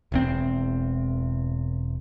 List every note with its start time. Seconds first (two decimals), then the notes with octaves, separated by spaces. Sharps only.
0.12 E1 E2 C4